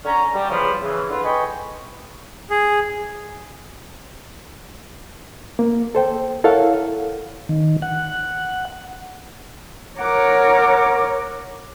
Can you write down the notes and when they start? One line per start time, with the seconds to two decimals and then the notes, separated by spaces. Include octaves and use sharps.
0.04 D3 C#4 A#5
0.33 G3
0.49 E2 C#3 E3 F3 C5 B5
0.82 C#3 E3
1.08 D3 F4 B4
1.23 B4 D#5 G5 G#5 B5 C#6
2.50 G#4
5.59 A#3
5.95 A4 C5 G5
6.44 E4 A4 A#4 C#5 F5 F#5
7.49 D#3
7.82 F#5
9.99 A#4 C#5 F#5 D6